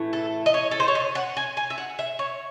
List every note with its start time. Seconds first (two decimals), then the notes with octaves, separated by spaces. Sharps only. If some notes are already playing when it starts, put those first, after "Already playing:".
Already playing: A2 E3 A3
0.13 A4
0.46 D#5
0.54 C#5
0.71 A4
0.80 C5
0.88 C#5
0.95 D#5
1.15 F#5
1.37 G#5
1.57 G#5
1.70 E5
1.78 F#5
1.99 E5
2.19 C#5